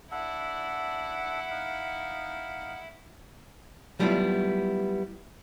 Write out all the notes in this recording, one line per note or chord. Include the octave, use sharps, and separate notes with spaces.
D4 E4 A4 F#5
D#4 F5
F#3 G3 A3 B3 E4 F4